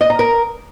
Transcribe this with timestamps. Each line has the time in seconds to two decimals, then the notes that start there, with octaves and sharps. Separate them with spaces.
0.01 D#5
0.10 A#5
0.19 A#4